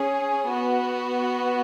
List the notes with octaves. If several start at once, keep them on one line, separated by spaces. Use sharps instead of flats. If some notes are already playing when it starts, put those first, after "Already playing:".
Already playing: C#4 G#4
B3 F#4